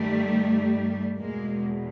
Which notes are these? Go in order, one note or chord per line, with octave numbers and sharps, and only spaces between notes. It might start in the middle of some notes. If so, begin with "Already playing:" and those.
Already playing: G2 D#3 G3 A3
E2 B2 G#3 A#3